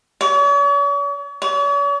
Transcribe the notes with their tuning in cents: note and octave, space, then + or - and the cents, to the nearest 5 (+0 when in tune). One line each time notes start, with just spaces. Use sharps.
C#5 +45
C#5 +45